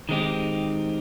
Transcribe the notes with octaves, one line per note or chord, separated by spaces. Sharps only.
D#3 G#3 C4 D#4 G4